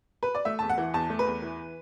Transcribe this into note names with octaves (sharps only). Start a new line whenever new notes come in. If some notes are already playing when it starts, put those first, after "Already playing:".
B4
D5
A3 E5
E2 A5
F#5
E3
E2 A5
A3
B4
E2
E3